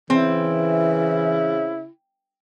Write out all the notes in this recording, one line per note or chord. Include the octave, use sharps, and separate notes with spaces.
C#3 E3 C4 E4